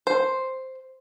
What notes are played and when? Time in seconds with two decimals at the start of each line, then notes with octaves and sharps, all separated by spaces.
0.07 C5